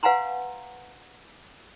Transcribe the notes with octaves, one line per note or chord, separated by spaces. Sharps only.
B4 F5 F#5 G#5 A#5 C6